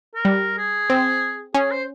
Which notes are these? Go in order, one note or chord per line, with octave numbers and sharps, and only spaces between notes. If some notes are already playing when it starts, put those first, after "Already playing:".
A#4
G3
G#4
C4
C#4 G#4
C5